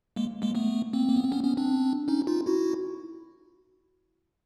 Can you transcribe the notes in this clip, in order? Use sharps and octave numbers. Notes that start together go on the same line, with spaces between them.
G#3 A#3
G#3 A#3
A3 B3
A#3 C4
A#3
B3
C4
B3 C#4
B3 C#4
C4 D4
C#4 D#4
D#4 F4
E4 F#4